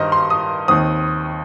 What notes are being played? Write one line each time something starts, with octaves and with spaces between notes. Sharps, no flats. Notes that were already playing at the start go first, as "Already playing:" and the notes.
Already playing: G2 D#3 G3 A#4 C5 D#5
C6
D#6
D#2 D#3 C4 D#6